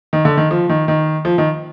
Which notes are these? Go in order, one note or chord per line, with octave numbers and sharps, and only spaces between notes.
D#3
D3
D#3
F3
D#3
D#3
F3
D#3